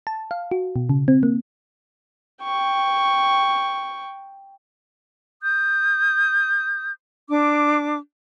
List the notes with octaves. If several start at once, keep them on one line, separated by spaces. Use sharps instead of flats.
A5
F5
F#4
B2
C#3
C4
A#3
G5 C#6
D#6 G6
D4 D6